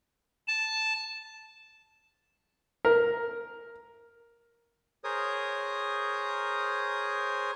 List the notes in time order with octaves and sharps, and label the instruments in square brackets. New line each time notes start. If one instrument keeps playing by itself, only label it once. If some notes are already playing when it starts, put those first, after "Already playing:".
[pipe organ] A5
[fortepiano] A#4
[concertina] G#4 A#4 C5 C#5 D#6